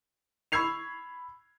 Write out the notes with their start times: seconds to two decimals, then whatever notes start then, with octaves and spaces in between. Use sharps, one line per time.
0.52 B5 C#6 E6 G#6 C7 F7